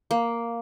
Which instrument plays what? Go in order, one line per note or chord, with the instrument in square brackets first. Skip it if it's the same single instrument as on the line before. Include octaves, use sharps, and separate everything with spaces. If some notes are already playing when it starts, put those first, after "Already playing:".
[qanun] A#3